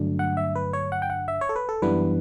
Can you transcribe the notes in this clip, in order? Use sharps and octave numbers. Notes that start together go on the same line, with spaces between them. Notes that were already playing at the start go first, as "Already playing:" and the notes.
Already playing: G2 D3 F#3 A3 D4
F#5
E5
B4
C#5
F#5
G5
F#5
E5
C#5
A4
B4
A4
F#2 E3 G3 B3 D4 B4